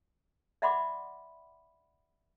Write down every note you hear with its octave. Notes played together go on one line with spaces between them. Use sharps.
D5 E5 F#5 B5 C6 D6